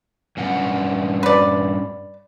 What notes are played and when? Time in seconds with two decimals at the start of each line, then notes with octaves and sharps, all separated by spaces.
0.37 G2 C#4 F#5
1.23 B4 D5